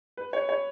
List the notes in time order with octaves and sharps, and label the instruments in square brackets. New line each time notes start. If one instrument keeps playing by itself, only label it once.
[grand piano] B4
C#5
C#5